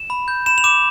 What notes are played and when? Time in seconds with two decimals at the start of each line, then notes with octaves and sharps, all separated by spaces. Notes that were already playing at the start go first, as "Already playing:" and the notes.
Already playing: E7
0.10 B5
0.28 G6
0.46 B5 E7
0.58 F7
0.64 D6 E7